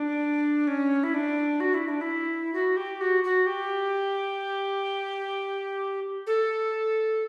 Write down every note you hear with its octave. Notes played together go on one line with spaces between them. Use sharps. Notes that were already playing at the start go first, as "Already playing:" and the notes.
Already playing: D4
C#4
E4
D4
F#4
E4
D4
E4
F#4
G4
F#4
F#4
G4
A4